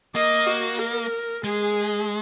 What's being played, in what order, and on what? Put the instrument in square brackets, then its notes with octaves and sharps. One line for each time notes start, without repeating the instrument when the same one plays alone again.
[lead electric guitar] A#3 [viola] D#5
[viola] F#4
A#4
[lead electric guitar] G#3 [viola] G#4